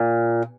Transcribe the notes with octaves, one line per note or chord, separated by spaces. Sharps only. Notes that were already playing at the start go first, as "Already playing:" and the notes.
Already playing: A#2